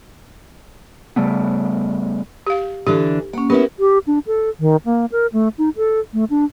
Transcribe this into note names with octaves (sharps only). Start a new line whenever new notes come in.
C#3 G3 A3 B3
G4 F5
D3 E3 D4 G4
A#3 C#4 F#5
B3 C#4 E4 G4 A#4
G4
D4
A4
D#3
A#3
A#4
A3
D#4
A4
A3
D4